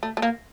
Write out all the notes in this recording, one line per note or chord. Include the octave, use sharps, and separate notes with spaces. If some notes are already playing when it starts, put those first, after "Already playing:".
A3
A3
A#3